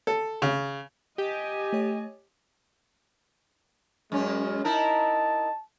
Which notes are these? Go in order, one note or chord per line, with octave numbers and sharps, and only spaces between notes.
A4
C#3
G4 D#5 G#5
A3 C#5
F#2 G#3 C#4
D#4 E4 A#4 A5